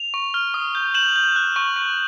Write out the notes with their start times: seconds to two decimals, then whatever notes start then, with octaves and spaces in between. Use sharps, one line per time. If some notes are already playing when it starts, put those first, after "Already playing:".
Already playing: F7
0.14 C#6
0.34 F6
0.54 D#6
0.75 G6
0.94 G6 E7 F#7
1.16 G6
1.36 F#6
1.56 C#6
1.76 C#6